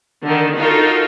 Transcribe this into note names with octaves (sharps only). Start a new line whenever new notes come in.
D3 D#3
D#4 F4 F#4 A4 A#4